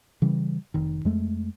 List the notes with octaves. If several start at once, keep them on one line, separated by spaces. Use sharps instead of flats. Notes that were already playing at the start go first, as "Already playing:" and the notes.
C#3 E3 G3
F1 D#3
F2 G#3 A3